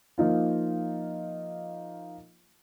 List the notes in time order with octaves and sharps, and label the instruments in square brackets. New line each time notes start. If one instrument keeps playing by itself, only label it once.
[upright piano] F3 A#3 D#4 F4